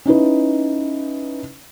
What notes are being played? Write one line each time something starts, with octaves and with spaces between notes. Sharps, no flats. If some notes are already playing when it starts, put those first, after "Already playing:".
C#4 D#4 E4 B4